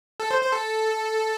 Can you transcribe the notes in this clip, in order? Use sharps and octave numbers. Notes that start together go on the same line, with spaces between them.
A4
C5
C5
A4